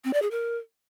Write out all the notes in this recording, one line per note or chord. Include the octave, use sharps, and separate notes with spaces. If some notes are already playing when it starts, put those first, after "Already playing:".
C4
D5
G#4
A#4